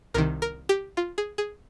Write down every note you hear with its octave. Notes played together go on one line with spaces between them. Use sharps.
C2 C3 D#3 A#4
A#4
G4
F4
G#4
G#4